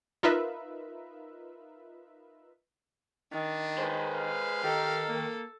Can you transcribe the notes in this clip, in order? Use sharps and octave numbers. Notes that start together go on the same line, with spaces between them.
D#4 F4 A#4 B4 E5
D#3 D4
G#3 B4 C5
F5
D#3 G4 A4
A#3